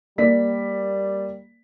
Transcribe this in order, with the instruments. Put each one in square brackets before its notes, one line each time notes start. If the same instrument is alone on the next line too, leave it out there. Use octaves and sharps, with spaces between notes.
[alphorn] G3 [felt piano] A#3 D5 B6